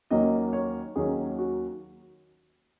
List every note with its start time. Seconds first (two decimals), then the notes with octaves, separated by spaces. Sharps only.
0.11 D#2 D#3 F#3 A#3 C#4 D#5
0.53 C#5
0.96 D#2 D#3 F#3 A#3 C#4 G#4
1.39 F#4